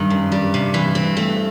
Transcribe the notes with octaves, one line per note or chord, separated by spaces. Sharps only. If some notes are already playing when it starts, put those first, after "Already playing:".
Already playing: G2 D#3
F#2
G3
C3
E3
C4
A3